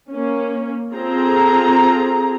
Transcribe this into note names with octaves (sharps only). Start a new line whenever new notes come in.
A#3 C#4
C4 F4 G#4 A4 A#5